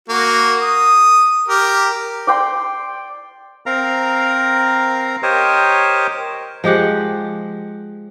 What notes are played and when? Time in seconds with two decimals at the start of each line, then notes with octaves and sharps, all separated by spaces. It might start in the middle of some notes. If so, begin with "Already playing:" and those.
0.09 A#3 F#4
0.62 D#6
1.48 G4 A#4
2.27 D5 G5 C6
3.66 C4 A#4 F5 A#5
5.23 G4 A#4 C5 C#5 D#5
6.64 F3 G#3 G4 F#5